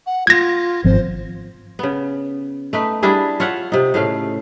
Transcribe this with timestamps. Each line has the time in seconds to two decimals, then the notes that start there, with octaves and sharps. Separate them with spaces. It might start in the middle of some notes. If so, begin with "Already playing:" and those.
0.06 F#5
0.27 F4 G#6 A#6
0.84 G#1 F3 C4 C5
1.79 C#3 B3
2.73 A3 D#4 B4
3.03 G3 D4 E4 G#4
3.40 F4 C#5 E5 F#5
3.72 C3 D#4
3.94 A2 C#3 A3 F5